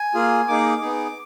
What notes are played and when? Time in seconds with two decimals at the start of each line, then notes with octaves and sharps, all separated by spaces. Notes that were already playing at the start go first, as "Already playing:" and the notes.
Already playing: G#5
0.14 A#3 F4 G#4
0.48 A#3 D#4 G#4 D6
0.81 B3 D#4 G#4